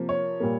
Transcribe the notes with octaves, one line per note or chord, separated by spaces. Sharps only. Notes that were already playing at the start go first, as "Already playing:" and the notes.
Already playing: C3 F3 A#3
C#5
A#2 G3 A#3